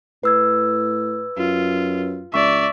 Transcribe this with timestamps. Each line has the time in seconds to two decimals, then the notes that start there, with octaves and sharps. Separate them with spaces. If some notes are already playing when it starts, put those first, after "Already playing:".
0.23 A2 B4 E6 G#6
1.38 F#2 F4
2.34 C#2 D5 E5 C#6